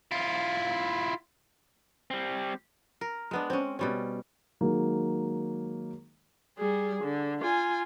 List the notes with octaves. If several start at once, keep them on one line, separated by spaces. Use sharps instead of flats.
E4 F4
G3 C4
A#4
G#3 B3 D4
C4 C#4
B2 G3 C#4
D#3 F#3 G#3 A#3
G3 G#4
D3
F4 G#5